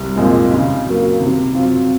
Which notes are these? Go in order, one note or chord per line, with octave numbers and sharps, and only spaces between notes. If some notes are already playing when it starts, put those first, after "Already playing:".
Already playing: C2
A#2 F3 G#3 C4
C#3
F#3 A#3
C3
F#3 C4 F4